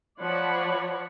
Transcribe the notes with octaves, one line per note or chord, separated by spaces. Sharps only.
F3 C#5 D5 F#5 B5